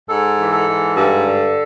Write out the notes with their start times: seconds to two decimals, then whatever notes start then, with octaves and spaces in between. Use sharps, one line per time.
0.09 G#2 A4
0.38 E3
0.53 A4
0.67 G#2
0.96 G2 A4
1.25 D3